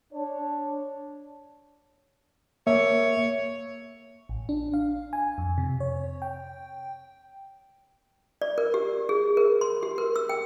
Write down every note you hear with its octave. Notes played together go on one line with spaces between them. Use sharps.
D4 C#5
A#3 C#5 E5
A1
D4
F5
G#5
F2
C3
C#5
G5
D5
A#4
G4
G#4
A#4
C6
G4
A#4
E6
G5